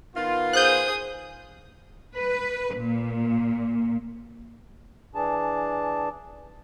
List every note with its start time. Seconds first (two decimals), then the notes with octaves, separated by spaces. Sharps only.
0.15 D#3 B3 F4
0.53 G#4 C5 D#6 F#6 G6
2.16 B4
2.77 A#2
5.15 E3 D4 G#4 A5